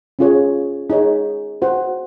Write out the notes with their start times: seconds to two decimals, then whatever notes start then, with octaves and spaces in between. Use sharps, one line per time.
0.19 C#4 F4 G#4 C#5
0.90 D#4 G#4 C#5
1.62 F#4 C5 F#5